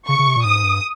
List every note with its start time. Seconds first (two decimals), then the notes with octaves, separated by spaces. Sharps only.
0.08 C#3 C#6
0.19 C#3
0.27 C3
0.36 A#2
0.44 G#2 D#6
0.63 G2